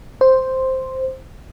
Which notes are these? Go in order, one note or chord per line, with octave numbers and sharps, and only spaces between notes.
C5